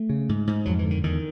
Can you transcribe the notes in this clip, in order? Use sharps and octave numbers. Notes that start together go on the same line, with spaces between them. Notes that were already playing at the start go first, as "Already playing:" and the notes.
Already playing: A3
C#3
G#2
G#2
F2 F#3
E3
D3
D#3
E2 D#3